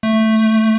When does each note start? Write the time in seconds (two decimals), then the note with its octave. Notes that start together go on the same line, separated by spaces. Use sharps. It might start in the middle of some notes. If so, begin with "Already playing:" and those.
0.03 A3